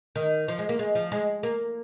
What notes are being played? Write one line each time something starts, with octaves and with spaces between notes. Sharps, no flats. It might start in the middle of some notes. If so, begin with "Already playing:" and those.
D#3
F3
G#3
A#3
G#3
F3
G#3
A#3